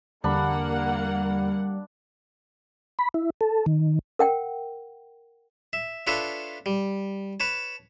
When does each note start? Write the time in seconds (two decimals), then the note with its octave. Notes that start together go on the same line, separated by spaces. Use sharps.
0.24 E2 D3 G3 A#3 D4 F#5 B5
2.99 B5
3.14 E4
3.41 A4
3.66 D#3
4.19 A#4 F#5 G5
5.73 E5
6.07 D4 F4 A4 B4 C#5 E5
6.66 G3
7.40 B4 C#5 A5